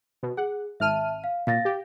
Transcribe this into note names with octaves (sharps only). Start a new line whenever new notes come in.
B2
G#4 F#5
G#1 E5 A5 F6 D#7
F5
A#2 F5 A6 A#6
G4